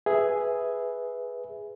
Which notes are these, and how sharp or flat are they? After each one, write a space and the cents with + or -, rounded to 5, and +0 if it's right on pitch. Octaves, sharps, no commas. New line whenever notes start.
G#4 +0 B4 +0 E5 +0